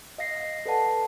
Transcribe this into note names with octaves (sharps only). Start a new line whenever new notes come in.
D#5 F5 A#6 C7
A4 B4 D5 F#5 A5